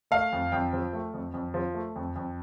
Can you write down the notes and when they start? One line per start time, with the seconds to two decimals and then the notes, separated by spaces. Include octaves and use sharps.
0.11 A3 F5
0.32 F2
0.52 F2 G5
0.73 F3
0.93 A3
1.14 F2
1.34 F2
1.54 F3
1.74 A3
1.96 F2
2.16 F2